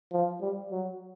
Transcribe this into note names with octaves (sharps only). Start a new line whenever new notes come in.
F3
G3
F#3